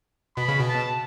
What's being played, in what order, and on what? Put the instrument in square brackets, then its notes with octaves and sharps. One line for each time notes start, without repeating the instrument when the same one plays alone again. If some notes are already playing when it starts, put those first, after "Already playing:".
[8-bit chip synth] B2 [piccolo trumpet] B5
[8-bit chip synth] C#3
B2
[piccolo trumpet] A5